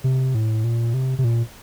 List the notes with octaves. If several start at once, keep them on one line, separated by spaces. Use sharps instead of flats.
C3
A2
A#2
C3
C3
A#2